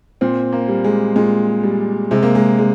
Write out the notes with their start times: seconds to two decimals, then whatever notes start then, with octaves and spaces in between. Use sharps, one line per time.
0.21 A#2 C4
0.52 A#3
0.68 G3
0.84 G#3
1.16 A#2 G#3
1.63 G3
2.11 C3 G#3
2.23 A#3
2.35 G#3
2.59 G#3